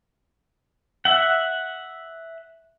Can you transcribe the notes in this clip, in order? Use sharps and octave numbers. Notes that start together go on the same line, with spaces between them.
E5 F#5